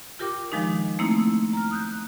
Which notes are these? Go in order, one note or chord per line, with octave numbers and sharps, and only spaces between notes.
F4 G4 A#4 G5 D6
D#3 F3 G#3 D4 D#4
A3 A#3 C4 D#4 E4
A#5 F6
D#6 F#6 G6